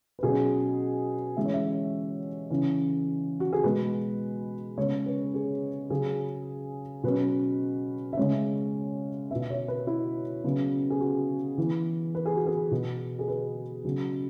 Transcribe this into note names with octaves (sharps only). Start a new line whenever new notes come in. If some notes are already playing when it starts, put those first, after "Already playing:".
B4
B2 F#3 C#4 G#4
E3 G#3 C#4 E5
C#5
E5
C#3 E3 C#4
F#4
G#4
B2 G#3 B3 B4
C#3 G#3 B3 C#5
B4
G#4
C#3 F#3 C#4 G#4
B2 F#3 C#4 B4
E5
C#3 G#3 C#4 C#5
B2 B3 E5
E5
C#5
B4
E4
C#3 F#3 B3
G#4
F#4
E3 B3
B4
G#4
F#4
G#4
B2 B3
G#4
B4
C#3 F#3 B3